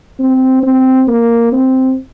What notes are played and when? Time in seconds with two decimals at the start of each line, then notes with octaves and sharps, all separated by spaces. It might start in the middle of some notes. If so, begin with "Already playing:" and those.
0.19 C4
0.63 C4
1.08 A#3
1.52 C4